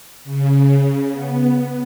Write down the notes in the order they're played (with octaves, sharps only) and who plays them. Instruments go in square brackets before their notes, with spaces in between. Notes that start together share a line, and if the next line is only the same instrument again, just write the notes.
[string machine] C#3
B3